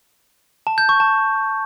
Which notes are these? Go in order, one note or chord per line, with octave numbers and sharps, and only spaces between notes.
A5
G6
C#6
A5